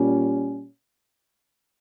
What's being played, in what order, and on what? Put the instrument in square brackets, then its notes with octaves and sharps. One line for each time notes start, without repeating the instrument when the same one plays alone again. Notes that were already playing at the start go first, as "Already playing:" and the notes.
Already playing: [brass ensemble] A#2 G3 C#4